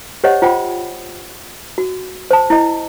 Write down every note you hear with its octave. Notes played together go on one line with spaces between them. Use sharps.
G4 C5 C#5 D#5 F#5
F4 C5 F#5 G5 B5
F#4
C5 A5
E4 D#5